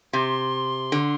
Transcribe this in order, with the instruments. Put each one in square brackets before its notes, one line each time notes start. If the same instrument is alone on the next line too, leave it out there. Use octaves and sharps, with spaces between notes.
[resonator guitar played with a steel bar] C3 [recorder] C6
[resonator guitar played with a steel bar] D3